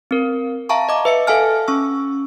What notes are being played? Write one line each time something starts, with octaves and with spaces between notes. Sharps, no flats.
C4 A#4
E5 F5 A5 A#5 C#6
D#5 D6
B4 E5 C#7
A4 E5 F5 G#5 A5 F6
C#4 C#6 E6